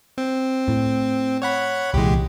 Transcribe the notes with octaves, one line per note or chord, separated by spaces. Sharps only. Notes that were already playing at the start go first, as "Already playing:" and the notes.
C4
A2
C#5 F#5 B5
C2 A#2 E3 G#3 G4